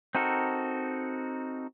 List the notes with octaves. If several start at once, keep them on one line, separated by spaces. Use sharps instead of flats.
C4 D#4 F#4 A4 A#4